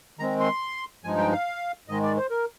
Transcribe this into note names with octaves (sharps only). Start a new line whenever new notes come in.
D#3 G#3 C4 A#5
C6
G2 F3 G#3 D#4 G#5
G5
F5
G#2 D#3 G#3 D#5
D5
C5
A#4